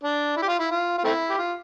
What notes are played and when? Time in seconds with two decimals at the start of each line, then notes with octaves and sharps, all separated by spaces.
0.03 D4
0.37 E4
0.42 G4
0.48 F4
0.59 E4
0.71 F4
0.98 F4
1.04 A3 C4 E4
1.30 G4
1.38 F4